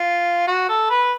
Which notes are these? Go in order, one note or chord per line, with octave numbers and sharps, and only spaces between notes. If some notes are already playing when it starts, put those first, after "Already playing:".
Already playing: F4
F#4
A4
B4